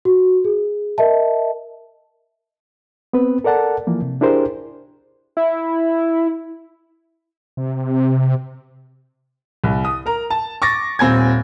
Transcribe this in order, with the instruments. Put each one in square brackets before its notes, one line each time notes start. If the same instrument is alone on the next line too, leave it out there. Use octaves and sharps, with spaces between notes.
[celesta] F#4
G#4
A#4 D#5 E5 A5
[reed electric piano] B3 C4 B4
A4 A#4 D5 F#5 A5
E3 F3 A#3
C3
D4 E4 G4 G#4 A#4 C5
[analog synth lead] E4
[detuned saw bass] C3
[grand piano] C2
D#6
A#4 A#5
A5
C#6 D6 A6 A#6
D#1 C4 G#5 G#6